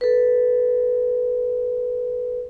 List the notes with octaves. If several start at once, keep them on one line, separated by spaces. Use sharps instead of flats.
A4 B4